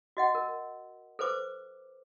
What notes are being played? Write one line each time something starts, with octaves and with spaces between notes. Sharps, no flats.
F#4 D#5 F#5
A#4
A4 B4 C5 D6